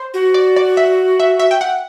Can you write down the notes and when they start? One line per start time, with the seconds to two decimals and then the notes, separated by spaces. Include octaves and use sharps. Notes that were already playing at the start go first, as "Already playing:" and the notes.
Already playing: C5
0.14 F#4
0.34 D5
0.56 D5
0.77 E5
1.20 E5
1.40 E5
1.51 G5
1.61 F#5